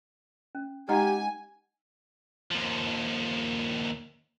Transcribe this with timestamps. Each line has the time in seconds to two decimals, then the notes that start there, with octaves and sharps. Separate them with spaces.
0.55 C#4
0.89 G#3 D#4 G4 D#5 F#5 G#5 A#5
2.51 D#2 F3